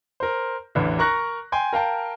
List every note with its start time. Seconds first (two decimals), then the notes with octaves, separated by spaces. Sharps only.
0.20 A#4 C5
0.75 A1 E2 D3 E3
0.99 A#4 A#5 C#6 F#6 A#6
1.52 G5 G#5 C6
1.73 A#4 F5 G5 A5